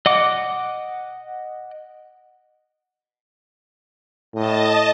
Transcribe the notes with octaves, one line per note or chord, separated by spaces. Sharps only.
D#5 F#5 D6
A2 D#5 A5